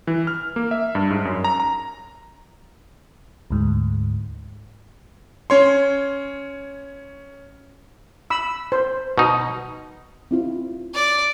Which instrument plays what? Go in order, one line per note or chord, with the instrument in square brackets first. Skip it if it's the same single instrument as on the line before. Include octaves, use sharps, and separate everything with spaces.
[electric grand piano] E3
F6
A#3
E5
G2
G#2
F#2
A#5
A#5
[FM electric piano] D2 G#2
[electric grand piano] C#4 C#5 C6
[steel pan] B5 E6
C5
[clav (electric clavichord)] B2 D#4
[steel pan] C4 E4 F4
[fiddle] D5